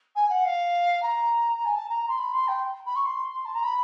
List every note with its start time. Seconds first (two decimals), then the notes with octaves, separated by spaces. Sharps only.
0.15 G#5
0.29 F#5
0.44 F5
1.02 A#5
1.65 G#5
1.75 A5
1.89 A#5
2.08 C6
2.18 B5
2.33 C6
2.48 G5
2.86 B5
2.96 C#6
3.05 C6
3.45 A5
3.54 A#5
3.64 B5